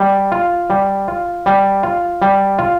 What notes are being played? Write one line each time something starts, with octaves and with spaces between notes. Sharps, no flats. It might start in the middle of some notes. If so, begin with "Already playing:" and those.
Already playing: G3
F4
G3
F4
G3
F4
G3
F4